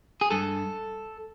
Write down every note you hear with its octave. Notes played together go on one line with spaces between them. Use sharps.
G#4
G2 A4